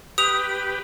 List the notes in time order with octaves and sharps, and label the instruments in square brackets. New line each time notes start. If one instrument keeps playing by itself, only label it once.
[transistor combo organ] G4 B4 [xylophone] D#6 F7